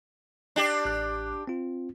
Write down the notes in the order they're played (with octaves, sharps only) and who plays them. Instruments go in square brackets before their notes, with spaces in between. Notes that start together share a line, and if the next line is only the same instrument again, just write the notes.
[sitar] D4 G4
[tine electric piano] A1 F#6
C4 F4